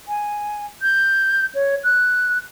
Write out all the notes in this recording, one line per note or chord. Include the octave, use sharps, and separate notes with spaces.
G#5
G6
C#5
F#6